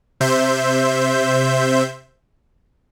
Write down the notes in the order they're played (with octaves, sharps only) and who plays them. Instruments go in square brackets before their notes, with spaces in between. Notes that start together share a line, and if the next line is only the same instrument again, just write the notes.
[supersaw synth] C3 C5 E5 G6